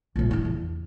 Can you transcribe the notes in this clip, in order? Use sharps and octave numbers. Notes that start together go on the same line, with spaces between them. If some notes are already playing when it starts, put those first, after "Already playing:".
A#1 A2
D4 E4
E2